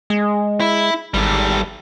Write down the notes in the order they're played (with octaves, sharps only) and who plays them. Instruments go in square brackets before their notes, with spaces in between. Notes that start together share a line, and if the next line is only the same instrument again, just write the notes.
[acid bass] G#3
[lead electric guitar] E4
[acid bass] G#1 [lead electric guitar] G3 A4